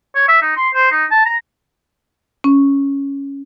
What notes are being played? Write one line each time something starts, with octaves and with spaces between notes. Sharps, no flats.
C#5
E5
D#4
C6
C5
D#4
A5
A#5
C#4